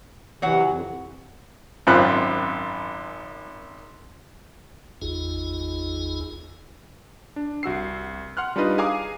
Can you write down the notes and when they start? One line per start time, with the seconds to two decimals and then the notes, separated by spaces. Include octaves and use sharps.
0.42 C3 E3 F#3 C#5 F#5
0.69 F2
1.87 G#1 F#2 C4 F4 B5 F#6
5.02 G#1 E2 D#4 F4 G#4
7.36 D4
7.63 C2 F#4 E6 C7
8.37 F#5 C6 F6 F#6
8.56 G3 D4 D#4 F4 B4 D#5
8.78 G#4 F5 G#5 A#5 D6 D#6